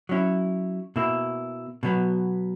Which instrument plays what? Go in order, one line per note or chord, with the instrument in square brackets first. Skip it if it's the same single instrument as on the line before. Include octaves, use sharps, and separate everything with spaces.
[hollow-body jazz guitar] F#3 C#4 E4
B2 A#3 E4
B2 F#3 B3